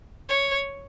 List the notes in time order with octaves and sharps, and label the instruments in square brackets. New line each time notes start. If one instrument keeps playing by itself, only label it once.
[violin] C#5